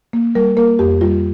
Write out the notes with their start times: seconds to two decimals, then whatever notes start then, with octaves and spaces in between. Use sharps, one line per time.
0.13 A#3
0.35 G3 A#4
0.57 A#3 A#4
0.79 F2 G4
1.01 G3 F4